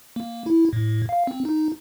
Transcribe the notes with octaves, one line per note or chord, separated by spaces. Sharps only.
A#3
E4
A2
F5
C4
D#4